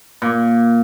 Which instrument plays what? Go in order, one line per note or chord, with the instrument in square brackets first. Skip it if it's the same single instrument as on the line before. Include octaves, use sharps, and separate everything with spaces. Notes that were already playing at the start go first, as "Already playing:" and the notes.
[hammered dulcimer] A#2